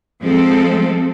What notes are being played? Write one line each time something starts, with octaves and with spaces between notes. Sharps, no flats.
F3 G#3 C4 A4